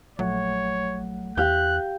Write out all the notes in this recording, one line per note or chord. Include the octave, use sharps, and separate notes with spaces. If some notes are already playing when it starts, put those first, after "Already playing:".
A#1 F#3 A3 C#5 F#5
E2 G4 F5 F#6 G6